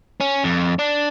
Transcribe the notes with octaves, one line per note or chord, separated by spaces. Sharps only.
C#4
F2
D4